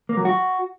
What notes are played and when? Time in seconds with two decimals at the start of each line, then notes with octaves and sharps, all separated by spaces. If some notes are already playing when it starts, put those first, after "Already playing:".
0.09 A#3
0.17 F#3
0.25 F#4